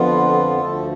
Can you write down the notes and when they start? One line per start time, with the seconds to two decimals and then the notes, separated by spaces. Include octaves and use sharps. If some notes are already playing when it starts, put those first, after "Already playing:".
Already playing: F2 D3 F3 B3 F4
0.60 D2 D3 F3 A3 A4